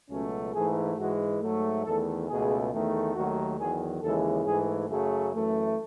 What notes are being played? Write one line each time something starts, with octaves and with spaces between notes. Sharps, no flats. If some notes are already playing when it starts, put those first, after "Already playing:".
C#2 B2 F#3 A3 C#4
G#2 E3 A3 G#4
G#2 E3 G#3 F#4
G#2 F#3 A3
E2 D#3 A3 A4
C#2 B2 A3 G#4
E2 D#3 A3
D#2 D#3 F#3 A3 F#4
E2 D#3 F#3 G#4
D#2 C#3 E3 G#3 A4
G#2 E3 A3 G#4
F#2 C#3 F#3 A3 G#4
F#2 E3 A3